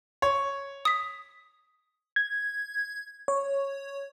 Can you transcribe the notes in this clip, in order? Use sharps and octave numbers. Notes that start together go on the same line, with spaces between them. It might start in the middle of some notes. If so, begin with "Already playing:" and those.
C#5
D#6 B6
G#6
C#5